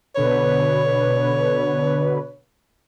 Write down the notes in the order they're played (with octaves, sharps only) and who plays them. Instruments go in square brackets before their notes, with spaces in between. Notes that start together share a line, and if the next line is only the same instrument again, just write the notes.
[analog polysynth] B2 D3 B4 [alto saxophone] C#5